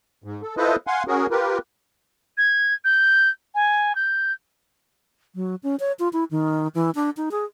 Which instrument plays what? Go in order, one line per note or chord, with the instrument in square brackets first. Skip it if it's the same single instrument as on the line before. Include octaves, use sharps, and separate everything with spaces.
[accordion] G#2
A4
E4 F4 A4 B4 C5 D#5
F5 F#5 G#5 C6
C#4 F#4 G#4 A#4
F4 G4 A#4 B4
[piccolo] G#6
G6
G#5
G6
[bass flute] F#3
C#4
C#5
F4
E4
D#3
E3
D4
D#4
G#4